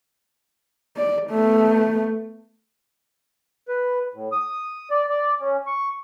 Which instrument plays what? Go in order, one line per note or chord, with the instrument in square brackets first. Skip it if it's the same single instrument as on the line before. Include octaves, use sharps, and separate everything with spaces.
[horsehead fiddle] D5
A3 B3
[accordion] B4
A2
D#6
D5
D5
C#4
C#6